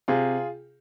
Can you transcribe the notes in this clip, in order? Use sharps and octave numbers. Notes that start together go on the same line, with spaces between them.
C3 F4 G#4